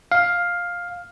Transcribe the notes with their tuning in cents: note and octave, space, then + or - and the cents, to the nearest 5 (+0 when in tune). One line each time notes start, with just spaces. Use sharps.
F5 +10